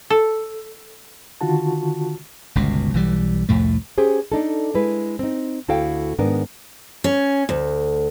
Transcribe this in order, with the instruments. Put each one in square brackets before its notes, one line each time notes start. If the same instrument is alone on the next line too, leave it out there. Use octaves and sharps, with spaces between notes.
[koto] A4
[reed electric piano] D3 D#3 F4 F#4 A5
[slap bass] G1 C#2 B2
B1 E3 G3
C2 F2 A2 A3
[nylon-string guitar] C#4 G4 G#4 C5
D4 D#4 A4
G#3 E4 B4
C4 D#4
D2 E4 F#4 A4 F5 G5
G#2 D#3 B3 D4 A#4
[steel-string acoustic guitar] C#4
D2